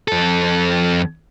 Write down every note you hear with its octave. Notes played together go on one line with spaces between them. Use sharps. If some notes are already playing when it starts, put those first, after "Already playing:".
F2 A4